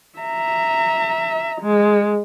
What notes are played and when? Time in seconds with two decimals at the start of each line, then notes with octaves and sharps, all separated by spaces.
0.19 E5 A#5
1.61 G#3